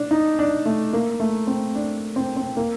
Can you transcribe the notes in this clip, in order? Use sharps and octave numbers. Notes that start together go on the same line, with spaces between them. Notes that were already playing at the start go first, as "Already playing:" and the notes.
Already playing: D4
D#4
D4
A3
A#3
A3
C4
D4
C4
C4
A#3